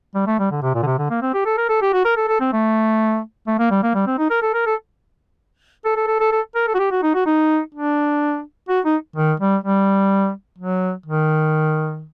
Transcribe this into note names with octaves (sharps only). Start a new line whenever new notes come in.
G3
A3
G3
D3
C3
A#2
D3
C3
D3
A#3
C4
G4
A4
A#4
A4
G4
F#4
A#4
A4
A4
C4
A3
A3
A#3
G3
A#3
G3
C4
D#4
A#4
A4
A#4
A4
A4
A4
A4
A4
A4
A#4
A4
F#4
G4
F#4
D#4
F#4
D#4
D4
F#4
D#4
D#3
G3
G3
F#3
D#3